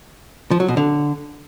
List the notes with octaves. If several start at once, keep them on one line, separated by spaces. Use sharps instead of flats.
F3
F#3
B2
D3